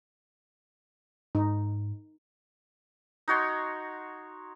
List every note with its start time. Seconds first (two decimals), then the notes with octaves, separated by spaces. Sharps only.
1.35 G#2 D#4
3.28 D#4 F#4 C#5 C6